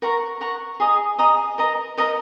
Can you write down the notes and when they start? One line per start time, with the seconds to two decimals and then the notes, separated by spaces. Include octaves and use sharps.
0.02 A#4 F#5 A#5 C#6
0.41 A#4 F#5 A#5 C#6
0.80 G#4 D#5 A#5 D#6
1.19 G#4 D#5 A#5 D#6
1.58 A#4 D#5 A#5
1.98 A#4 D#5 A#5